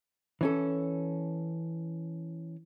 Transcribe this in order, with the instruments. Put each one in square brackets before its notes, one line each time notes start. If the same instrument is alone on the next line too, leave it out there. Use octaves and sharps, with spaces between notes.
[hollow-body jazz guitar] E3 C#4 A4